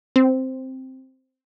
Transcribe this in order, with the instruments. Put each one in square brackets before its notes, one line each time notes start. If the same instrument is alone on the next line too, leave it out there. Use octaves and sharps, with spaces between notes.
[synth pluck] C4